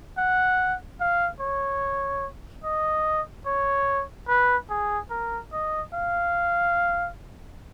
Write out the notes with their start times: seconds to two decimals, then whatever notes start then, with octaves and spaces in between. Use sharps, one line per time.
0.18 F#5
1.01 F5
1.41 C#5
2.64 D#5
3.46 C#5
4.28 B4
4.70 G#4
5.11 A#4
5.53 D#5
5.94 F5